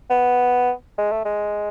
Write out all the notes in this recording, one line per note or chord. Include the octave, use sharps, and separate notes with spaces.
B3
G#3
A3
G#3